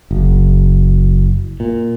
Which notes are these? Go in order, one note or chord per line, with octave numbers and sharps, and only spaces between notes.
F#1
A#2